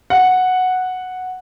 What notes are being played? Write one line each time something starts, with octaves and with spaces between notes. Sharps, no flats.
F#5